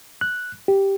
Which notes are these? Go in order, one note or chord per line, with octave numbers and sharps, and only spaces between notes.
F#6
G4